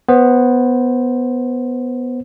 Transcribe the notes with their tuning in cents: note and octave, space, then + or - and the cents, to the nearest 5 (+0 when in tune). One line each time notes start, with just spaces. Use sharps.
B3 +0 C5 +15